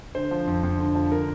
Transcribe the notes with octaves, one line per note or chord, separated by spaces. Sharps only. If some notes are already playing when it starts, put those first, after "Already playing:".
D3 C5
F3
F2
F2
D3
F3
D3 A#4